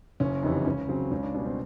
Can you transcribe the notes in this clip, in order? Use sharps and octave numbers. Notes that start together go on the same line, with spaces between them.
F#1 C#4
F2 C3 E3 D#4
C#2 C#4
C#3 F#3 C4
C#2 C#4
D4
B2 G3 C#4
C4